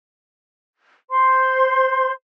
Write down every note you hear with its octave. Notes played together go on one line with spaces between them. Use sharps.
C5 C6